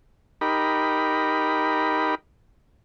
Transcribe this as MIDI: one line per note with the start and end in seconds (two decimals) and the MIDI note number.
0.41 2.15 63
0.41 2.15 67
0.41 2.15 70
0.41 2.15 83